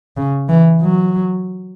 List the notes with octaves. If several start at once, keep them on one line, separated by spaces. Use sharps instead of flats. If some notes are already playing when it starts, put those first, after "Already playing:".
C#3
E3
F#3